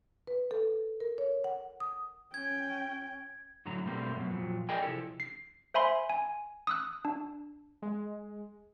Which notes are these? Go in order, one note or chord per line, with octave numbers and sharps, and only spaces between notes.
B4
A4
A#4
C#5
F#5
D#6
C#4 G5 G#6
F#2 A2 D3 F#3 A#5
B2 G3 A3 A#3 C4 G4
F#2 B2
F2 A#2 F3 F#3
G#4 A#4 D5 D#5 G5 G#5
C3 F3 E4 G4 A4
C7
C5 E5 G#5 B5 C6
G#5
D#6 E6 F#6
D4
G#3